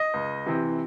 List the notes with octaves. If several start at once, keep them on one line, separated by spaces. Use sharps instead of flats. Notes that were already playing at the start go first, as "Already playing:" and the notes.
Already playing: D#5
C#2
C3 E3 C4